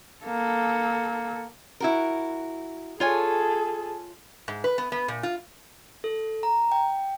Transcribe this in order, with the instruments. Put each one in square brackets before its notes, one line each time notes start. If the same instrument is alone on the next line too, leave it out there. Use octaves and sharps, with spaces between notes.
[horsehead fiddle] A#3 A4
[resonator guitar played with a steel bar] E4 F#4 A#4
[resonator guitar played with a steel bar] F4 C#5 G#5 [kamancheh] G#4 A4
[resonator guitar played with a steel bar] G#2
B4
B3
B3
A#2
F4
[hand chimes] A4
A#5
G5